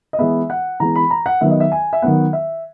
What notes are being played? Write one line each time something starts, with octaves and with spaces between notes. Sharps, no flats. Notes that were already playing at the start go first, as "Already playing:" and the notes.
D#5
E3 G#3 B3 E5
F#5
E3 G#3 B3 A#5
B5
A#5
F#5
D#3 F#3 B3 E5
D#5
E5
G#5
E5
D#3 F#3 B3 F#5
E5